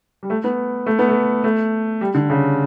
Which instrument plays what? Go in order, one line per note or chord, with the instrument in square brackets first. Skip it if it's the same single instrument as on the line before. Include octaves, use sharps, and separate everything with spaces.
[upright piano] G3
A3
B3
A3
B3
A3
A3
G3
D3
C#3